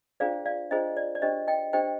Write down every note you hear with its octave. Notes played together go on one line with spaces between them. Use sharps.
D4 F4 G#4 C5 D5 F5
D5 F5
D4 F4 G#4 C5 D#5
D5
D5
D4 G4 C5 D#5
D#5 G5
D4 G4 C5 D#5 G5